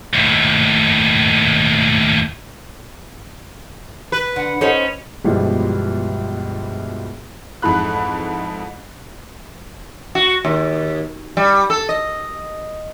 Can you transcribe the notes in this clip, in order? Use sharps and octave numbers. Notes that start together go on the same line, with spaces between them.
D#2 A2
B4
D3 F#5
C#4 D#4 A4 C5
G1 C#2 B2 E3 F3 G3
F2 G#2 E3 B5 F#6
F#4
D#2
G3
A4
D#5